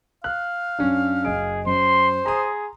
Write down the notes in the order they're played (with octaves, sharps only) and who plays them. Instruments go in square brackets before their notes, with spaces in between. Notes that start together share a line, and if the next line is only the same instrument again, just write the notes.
[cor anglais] F5 [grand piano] F#6
[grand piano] F#2 C#4 D4
[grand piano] F#1 D#5 D7 [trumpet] G#4
[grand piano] F#2 [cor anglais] C5 [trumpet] C6
[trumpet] G#4 [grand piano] A#5 C6 D#6